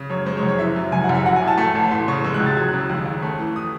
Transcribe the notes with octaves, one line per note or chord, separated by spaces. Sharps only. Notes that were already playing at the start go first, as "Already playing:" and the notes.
Already playing: C#3
F#2 C#5
G#3 C5
C#5
F#1
C#5
E3 E5
F#2
F#1 G#5
F#5
F#1
E5
F#3 F#5
G#5
A2
A5
A3 A5
A1
E3 C6
C#3 C#6
G#3 E6
F#6
C#2
A6
F#3 G#6
F#6
C#3
E6
D#2 F#6
D#2
A3
E3
D#6